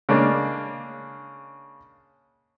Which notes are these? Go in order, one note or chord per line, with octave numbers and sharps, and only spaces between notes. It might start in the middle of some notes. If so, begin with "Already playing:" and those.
C#3 G#3 A#3 D4